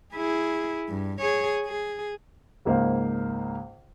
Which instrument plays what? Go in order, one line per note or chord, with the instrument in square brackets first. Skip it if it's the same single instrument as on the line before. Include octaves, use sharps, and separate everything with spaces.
[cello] E4 G#4
G2
G#4 C#5
G#4
[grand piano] C#2 G#2 A#3 C5 F5